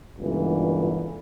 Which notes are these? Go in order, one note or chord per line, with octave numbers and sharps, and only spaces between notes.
G1 C#2 A#2 D3 E3